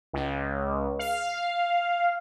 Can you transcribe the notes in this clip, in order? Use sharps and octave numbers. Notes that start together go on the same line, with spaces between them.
C#2
F5